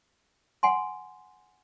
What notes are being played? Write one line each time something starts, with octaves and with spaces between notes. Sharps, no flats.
F#5 G#5 C6